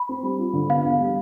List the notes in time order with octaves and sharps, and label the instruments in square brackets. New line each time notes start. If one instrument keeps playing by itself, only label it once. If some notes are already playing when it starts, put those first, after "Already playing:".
Already playing: [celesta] B5
[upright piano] C4
G3
F4
D3
[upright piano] B3 [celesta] F5
[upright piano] E2
G3